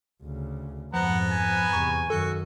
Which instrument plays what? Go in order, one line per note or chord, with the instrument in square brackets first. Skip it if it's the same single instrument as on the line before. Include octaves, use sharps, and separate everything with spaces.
[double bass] D2 C#3
[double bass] F2 G#2 [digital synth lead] F3 [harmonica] B3 B4 A#5 [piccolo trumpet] F#5
[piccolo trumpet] G#5
[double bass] E2 C3 [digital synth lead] C#6
[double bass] F#2 D#3 [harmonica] F#4 [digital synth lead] A4